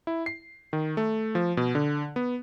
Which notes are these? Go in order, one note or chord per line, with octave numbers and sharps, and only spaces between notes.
E4
C7
D#3
A3
F3
B2
D3
B3